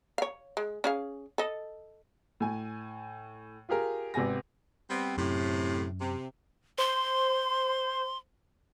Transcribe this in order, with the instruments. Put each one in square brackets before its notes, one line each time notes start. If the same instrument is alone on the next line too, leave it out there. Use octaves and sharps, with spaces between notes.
[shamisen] C#5 F5
G#3
C#4 G#4 F5
A4 D#5
[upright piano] A2 G#5
F4 G4 G#4 A#4
G#1 C3 B3 G#5 A#6
[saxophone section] G3 B3 C4
[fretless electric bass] F#2 [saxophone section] A2 C3
[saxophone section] C3
[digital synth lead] C5 [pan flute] C6